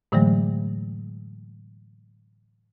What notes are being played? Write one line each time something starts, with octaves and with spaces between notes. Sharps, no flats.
A2 D3 E3 F#3 G#3 A3